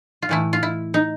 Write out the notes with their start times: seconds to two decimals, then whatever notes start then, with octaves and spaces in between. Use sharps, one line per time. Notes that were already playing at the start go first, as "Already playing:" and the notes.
0.22 F4
0.29 A2 E3 A3 E4
0.53 F4
0.63 E4
0.94 D#4